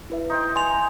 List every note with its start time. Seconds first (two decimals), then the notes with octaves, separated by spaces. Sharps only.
0.10 E4 B4 E5
0.30 D#4 C5 G5
0.56 G#5 A5 C6 F7